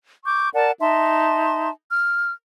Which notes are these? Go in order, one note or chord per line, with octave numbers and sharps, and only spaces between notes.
C#6 D6 G6
A#4 D5 F#5 A5
D#4 E5 A5 C6
F6